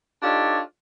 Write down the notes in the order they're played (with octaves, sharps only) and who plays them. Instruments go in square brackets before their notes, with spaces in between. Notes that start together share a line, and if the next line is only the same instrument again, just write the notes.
[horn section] D4 D#4 F4 G4 A4 C#5